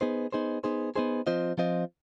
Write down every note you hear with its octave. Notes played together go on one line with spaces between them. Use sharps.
B3 D#4 G#4 C5
B3 D#4 G#4 C5
B3 D#4 G#4 C5
B3 D#4 G#4 C5
F3 C4 F4 C5 D#5
F3 C4 F4 C5 D#5